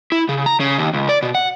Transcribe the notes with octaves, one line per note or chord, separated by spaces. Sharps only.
E4
C#3
A#5
C#3
D#2
C#2
D5
B2
F#5